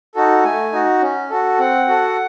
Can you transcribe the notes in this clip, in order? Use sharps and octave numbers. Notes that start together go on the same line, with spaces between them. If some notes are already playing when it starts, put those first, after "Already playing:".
D#4 F#4 A4
A3 G#5
D#4 F#4
C#4
F#4 A4
C4 F#5
F#4 A4